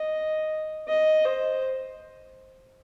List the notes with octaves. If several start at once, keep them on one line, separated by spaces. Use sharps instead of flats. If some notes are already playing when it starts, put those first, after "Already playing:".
Already playing: D#5
D#5
C5